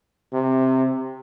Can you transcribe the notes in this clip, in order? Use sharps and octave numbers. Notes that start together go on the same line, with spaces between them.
C3